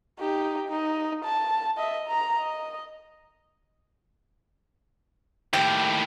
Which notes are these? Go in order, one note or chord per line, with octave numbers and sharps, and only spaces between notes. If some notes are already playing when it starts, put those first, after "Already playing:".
D#4 G4
D#4
A5
D#5 E5
A#5
D#5
D#2 A2 G4